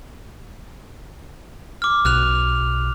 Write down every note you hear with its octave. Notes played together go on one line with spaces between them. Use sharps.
D6 F6
B1 F6 F#6 F7